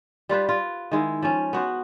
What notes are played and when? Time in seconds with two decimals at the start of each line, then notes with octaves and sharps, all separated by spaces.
0.29 G3 F4 B4 C5
0.49 F4
0.91 D#3 G#3 E4
1.22 F3 C#4
1.53 B3 F#4 C5